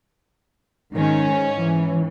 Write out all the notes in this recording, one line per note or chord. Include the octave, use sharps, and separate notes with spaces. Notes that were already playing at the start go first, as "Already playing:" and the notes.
G#2 D#3 C#4
E3